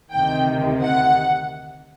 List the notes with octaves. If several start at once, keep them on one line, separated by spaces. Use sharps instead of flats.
D2 C3 D#3 G5
F#5